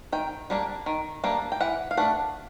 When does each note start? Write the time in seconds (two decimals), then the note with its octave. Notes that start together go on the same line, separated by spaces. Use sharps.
0.12 D#3 G5
0.50 G3 A#3 D4
0.86 D#3
1.24 G3 A#3 D4
1.52 G5
1.60 E3 F#5
1.91 F5
1.97 A3 D4 F#5